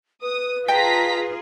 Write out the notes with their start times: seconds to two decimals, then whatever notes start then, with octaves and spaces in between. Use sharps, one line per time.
0.22 B4 D#6
0.68 F4 G#4 D#5 G5 A5 A#5 B6